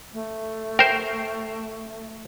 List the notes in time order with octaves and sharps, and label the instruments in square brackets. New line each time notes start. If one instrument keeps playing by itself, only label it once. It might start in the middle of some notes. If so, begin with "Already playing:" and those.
[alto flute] A3
[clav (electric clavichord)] A#4 C5 [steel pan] G5